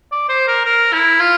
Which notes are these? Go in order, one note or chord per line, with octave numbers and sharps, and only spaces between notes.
D5
C5
A#4
A#4
E4
F4